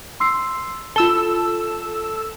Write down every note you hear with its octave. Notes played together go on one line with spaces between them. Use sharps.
C6 E6 C7
F4 A4 E6 E7 G7